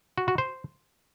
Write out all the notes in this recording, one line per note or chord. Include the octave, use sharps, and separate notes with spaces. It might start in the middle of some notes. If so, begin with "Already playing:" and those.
F#4
F#4
C5